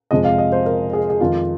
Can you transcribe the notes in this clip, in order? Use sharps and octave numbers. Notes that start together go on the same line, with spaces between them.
F2 C3 F3 G#3 D#5
F5
D#5
C5
A#4
G#4
G#4
F2 D#3 G#3 F4